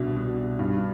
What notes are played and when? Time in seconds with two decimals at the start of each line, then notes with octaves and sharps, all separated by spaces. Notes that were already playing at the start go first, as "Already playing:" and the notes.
Already playing: C2 B2 D4
0.16 B2
0.59 G2